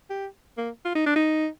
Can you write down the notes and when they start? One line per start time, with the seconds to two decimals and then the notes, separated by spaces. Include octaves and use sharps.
0.10 G4
0.58 A#3
0.85 F4
0.95 D#4
1.06 D4
1.16 D#4